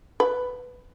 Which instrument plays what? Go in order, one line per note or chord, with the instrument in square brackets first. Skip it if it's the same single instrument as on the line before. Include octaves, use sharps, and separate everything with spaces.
[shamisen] B4